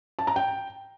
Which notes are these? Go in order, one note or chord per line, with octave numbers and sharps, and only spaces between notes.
A5
A#5
G5